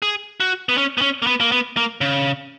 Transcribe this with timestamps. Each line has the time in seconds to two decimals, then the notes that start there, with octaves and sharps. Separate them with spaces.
0.02 G#4
0.40 F#4
0.69 B3
0.78 C#4
0.98 B3
1.01 C#4
1.22 A#3
1.27 B3
1.40 A#3
1.52 B3
1.77 A#3
2.01 C#3